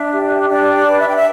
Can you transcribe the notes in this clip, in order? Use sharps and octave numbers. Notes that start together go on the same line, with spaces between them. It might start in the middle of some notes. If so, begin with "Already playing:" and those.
Already playing: D4 E5
G4
D4 D5
D5
B4
E5
G5
E5